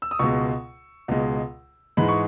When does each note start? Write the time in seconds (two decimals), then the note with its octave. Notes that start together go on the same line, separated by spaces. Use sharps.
0.02 E6
0.11 D#6
0.19 C#2 B2 G#3 C#6
1.08 C#2 B2 G#3
1.97 G#2 E3 G#3 B5
2.09 C#6